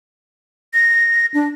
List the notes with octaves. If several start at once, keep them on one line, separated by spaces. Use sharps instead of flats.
A#6
D4